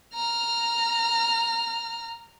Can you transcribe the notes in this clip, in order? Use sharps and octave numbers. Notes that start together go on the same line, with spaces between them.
A#5 F6